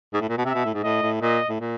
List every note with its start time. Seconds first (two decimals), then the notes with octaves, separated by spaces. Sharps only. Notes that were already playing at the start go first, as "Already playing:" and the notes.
0.14 G#2
0.21 A2
0.29 A#2
0.38 B2
0.45 C3 E5
0.55 B2
0.65 A2
0.74 G#2
0.83 A2 D#5
1.02 A2
1.22 A#2 D#5
1.49 A2
1.61 A#2